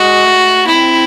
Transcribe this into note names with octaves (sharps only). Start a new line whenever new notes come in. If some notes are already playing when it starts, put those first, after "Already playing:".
Already playing: G#3 F#4
A3
C4 E4